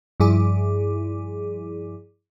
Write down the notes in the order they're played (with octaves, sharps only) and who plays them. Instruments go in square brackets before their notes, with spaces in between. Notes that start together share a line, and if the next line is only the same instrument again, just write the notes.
[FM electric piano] G2 F3 E4 G#4 D6